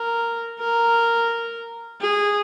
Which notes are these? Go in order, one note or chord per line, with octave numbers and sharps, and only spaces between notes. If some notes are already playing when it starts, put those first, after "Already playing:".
Already playing: A#4
A#4
G#4